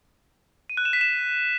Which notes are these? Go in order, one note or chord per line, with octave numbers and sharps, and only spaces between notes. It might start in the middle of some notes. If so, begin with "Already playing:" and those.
D#7
F#6
E7
B6
E7